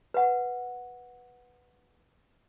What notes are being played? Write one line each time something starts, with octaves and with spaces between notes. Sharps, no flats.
B4 F#5